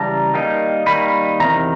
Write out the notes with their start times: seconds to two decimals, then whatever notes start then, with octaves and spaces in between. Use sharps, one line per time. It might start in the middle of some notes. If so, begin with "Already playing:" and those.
Already playing: C#3 E3 G3 A5 A#5
0.34 D#3 G3 A#3 D#4
0.86 D#3 G3 A#3 D#4 B5
1.40 E2 C3 D#3 A#5